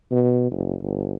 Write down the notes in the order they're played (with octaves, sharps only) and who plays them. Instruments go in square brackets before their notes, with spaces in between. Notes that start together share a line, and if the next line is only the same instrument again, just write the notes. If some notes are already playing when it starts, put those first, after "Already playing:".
[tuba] B2
F#1
G1